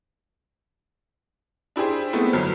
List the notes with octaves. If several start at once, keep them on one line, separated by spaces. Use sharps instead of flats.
D4 E4 G4 G#4 C5
G#3 A3 B3 C4 E4
G1 F2 F#3 F6